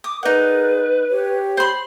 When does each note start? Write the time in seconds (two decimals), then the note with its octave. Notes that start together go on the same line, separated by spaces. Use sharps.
0.04 D6 D#6
0.23 D#4 G#4 A#4 B4 D5 F#5
1.10 G4 C#5
1.57 C5 B5 C6